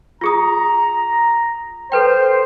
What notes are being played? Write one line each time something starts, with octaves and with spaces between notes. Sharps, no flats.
F4 G#4 A#5 D#6
A4 B4 C5 G5